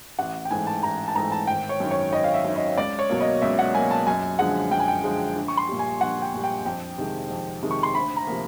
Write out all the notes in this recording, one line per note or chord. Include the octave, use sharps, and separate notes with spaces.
A1 F#5
G5
G#2 E3 A3 G#5
A5
A1 A#5
A5
G#2 E3 A3 A#5
A5
G#1 G5
C#5
F#2 D#3
C#5
G#1 D#5
F5
E5
F#2 D#3
D#5
C#2 D5
C#5
B2 F#3 A#3
D#5
C#2 E5
F#5
B2 F#3 A#3 G#5
A5
F#2 G#5
D3 F3 G#3 F#5
F#2 G5
G#5
G5
D3 F3 G#3
A#1
C#6
C6
A#2 G3
G#5
A#1 F#5
G5
A#2 G3
G5
F2 G5
C3 D#3 G#3
F2
C3 D#3 G#3
C#6
C6
D2 B5
A#5
C3 F3 A#3